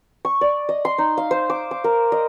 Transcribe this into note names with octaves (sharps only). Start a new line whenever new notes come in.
C#6
D5
D#5
C6
D#4
F5
C5
D6
D6
A#4
D#5